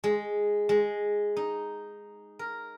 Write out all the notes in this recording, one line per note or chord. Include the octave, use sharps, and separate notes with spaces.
G#3
G#3
D#4
A#4